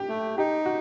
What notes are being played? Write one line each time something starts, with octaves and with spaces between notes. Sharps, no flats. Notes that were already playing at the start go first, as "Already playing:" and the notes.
Already playing: G4
A3
D#4 G4
F#4